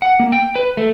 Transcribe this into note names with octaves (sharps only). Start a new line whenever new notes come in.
F#5
A#3
G5
B4
A3